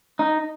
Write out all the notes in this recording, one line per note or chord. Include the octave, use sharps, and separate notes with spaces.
D#4